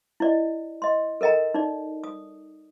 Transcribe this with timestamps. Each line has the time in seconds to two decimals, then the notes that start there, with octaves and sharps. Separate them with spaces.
0.20 E4 D5 D#5
0.82 D#5 C6
1.21 A4 A#4 D#5 G5 A#5
1.54 D#4 D5
2.04 D#6